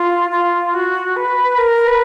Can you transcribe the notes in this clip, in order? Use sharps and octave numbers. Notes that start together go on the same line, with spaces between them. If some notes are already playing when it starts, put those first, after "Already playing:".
Already playing: F4
F4
F#4
B4
A#4
B4